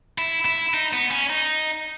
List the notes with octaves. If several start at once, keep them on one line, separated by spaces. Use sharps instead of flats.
E4
E4
D#4
B3
C#4
D#4